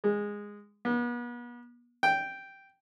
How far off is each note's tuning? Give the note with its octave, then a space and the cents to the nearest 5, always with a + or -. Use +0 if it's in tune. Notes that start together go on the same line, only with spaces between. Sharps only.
G#3 -10
B3 -40
G5 -5